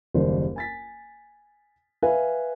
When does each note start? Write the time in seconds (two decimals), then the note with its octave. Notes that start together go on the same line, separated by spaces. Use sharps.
0.14 F#1 D#2 G3 C5
0.56 G#5 A6 B6
2.03 B4 E5 F5 G#5